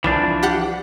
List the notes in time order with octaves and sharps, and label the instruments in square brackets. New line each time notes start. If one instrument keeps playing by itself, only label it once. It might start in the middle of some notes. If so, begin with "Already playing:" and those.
[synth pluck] C2 [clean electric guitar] E3 F3 D4
[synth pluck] G4 F#5 F#6